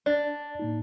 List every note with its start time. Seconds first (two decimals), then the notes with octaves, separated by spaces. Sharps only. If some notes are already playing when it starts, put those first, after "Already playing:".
0.06 D4 D5 A6
0.59 A2 A#3 D#4